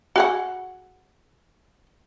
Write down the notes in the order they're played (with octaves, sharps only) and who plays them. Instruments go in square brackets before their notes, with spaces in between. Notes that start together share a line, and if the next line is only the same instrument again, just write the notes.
[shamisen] F#4 G#4 F#5